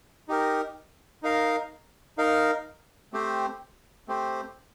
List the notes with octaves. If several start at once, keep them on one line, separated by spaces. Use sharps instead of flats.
D#4 G4 A#4
D#4 A#4 F5
D#4 A#4 F5
A3 C4 G4 C5
A3 C4 G4 C5